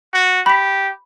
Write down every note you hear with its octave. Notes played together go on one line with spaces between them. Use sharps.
F#4
G4 B5 B6